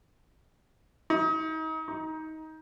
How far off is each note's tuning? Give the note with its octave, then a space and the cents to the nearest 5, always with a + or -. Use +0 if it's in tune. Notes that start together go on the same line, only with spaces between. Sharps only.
D#4 +35
D#4 +20